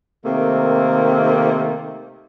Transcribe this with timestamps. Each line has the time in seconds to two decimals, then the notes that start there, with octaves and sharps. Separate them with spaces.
0.25 C3 D#3 A3 A#3 C4